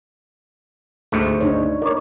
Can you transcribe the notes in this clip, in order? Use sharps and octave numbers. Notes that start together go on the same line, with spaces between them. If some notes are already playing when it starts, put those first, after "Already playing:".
D2 G#2 A3
D4 D#4 C#5
A#4 C#5 D5